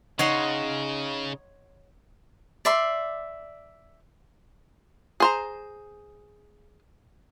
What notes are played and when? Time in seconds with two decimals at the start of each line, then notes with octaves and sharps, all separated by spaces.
0.19 C#3 D#4 C#5 F#5 C6
2.65 D5 E5 C6
5.20 G#4 C5 A#5